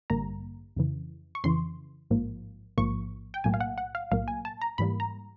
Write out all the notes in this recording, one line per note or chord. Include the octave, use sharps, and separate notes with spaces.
A1 G2 D3 G3 A#3 A#5
F2 C#3 E3
C#6
F2 C#3 E3 C6
A1 G#2 F3 A#3
A1 G#2 F3 A#3 C#6
G5
B1 A2 F#3 A#3 G#5
F5
F#5
F#5
F5
B1 A2 F#3 A#3 F5
G#5
A5
A#5
G#2 E3 G3 A#3 B5
A#5